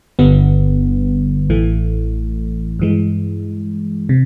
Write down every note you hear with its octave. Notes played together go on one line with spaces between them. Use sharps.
G1 G2 D3 G3 B3
A1 A2 E3 A3
G2 E3 G#3
C3